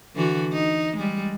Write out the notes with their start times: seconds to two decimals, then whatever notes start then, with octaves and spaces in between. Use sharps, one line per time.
0.15 D3 E3 F#4
0.53 D#4
0.97 G3 G#3